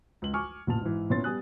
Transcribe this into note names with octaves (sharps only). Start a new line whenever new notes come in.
C#2 F#7
G#5 C#6 D6 F6
A1 A#2 A5 F7
G#2 E3
A#2 B3 C#4 E4 C6 A6
G3 B3 G#5 D#6 F#6